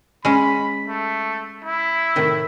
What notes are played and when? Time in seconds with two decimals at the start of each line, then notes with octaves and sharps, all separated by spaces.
0.25 G#3 C#4 B5
0.88 A3
1.64 E4
2.16 A2 C3 D#3